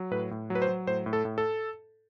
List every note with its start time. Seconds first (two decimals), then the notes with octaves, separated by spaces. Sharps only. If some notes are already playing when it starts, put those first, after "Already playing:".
Already playing: F#3
0.11 A2 B4
0.31 A2
0.50 F#3
0.55 B4
0.62 C5
0.68 F#3
0.87 A2 C5
1.06 A2
1.13 A4
1.25 A2
1.38 A4